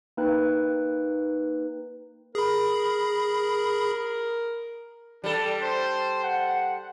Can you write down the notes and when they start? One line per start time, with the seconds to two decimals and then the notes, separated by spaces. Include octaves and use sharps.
0.17 A#3 D#4 B4 G5 F#6
2.35 G#4 A#4 B5
5.24 G3 D4 A4
5.61 C5
6.24 C5 F#5